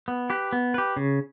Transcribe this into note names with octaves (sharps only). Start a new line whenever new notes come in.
B3
G4 B4
B3
G4 B4
C#3